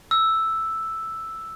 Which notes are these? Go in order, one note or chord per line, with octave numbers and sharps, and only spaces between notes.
E6